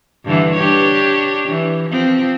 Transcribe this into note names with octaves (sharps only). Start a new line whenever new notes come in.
G2 D3 E3
D4 G4 C#5
E3
F3 C4